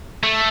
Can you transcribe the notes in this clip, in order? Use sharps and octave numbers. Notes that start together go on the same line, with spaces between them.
A3